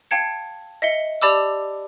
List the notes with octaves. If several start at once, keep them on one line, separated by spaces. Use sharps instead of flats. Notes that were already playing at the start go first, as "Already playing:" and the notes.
F5 G5 A5 G#6 C#7
D#5 E5 C#7 G7
G4 D5 A5 B5 D6 E6